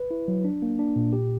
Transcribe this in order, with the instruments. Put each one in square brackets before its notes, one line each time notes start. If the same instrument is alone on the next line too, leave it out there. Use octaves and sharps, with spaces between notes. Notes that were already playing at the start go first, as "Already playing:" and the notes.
Already playing: [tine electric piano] B4
E4
F#3
D4
A#3
D4
A#2
G4